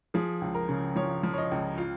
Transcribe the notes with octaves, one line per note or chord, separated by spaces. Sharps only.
F3 G#4
C#2
A#4
C#3
F3 C#5
F3
C#5
D#5
C#2
F4